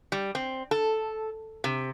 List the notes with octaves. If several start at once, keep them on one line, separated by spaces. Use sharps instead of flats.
G3
C4
A4
C3